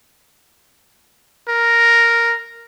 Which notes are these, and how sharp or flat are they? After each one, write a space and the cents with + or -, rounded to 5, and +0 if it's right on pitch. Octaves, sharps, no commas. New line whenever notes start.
A#4 +0